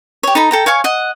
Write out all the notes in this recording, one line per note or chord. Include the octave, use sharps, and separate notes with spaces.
G4 C#5
D#4 A4 A#5 B5
A4 G5 A#5
C#5 F5 G#5 C#6
D#5 F#5